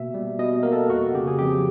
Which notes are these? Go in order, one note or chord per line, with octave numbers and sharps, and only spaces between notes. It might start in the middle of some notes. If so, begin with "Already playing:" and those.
Already playing: B2 A#3 E5
G3
B2 D#5
A#3 A#4
A4
F2 F#4
C#3 G4
G#4
F2 G4